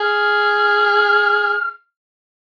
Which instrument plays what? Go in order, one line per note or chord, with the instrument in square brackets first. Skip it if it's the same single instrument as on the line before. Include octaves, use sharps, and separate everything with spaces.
[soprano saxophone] G#4 [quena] F6